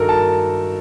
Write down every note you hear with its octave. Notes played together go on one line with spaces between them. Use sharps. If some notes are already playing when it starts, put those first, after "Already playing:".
Already playing: G2 D#3 F#3 D#4 F#4 A4 A#4
A5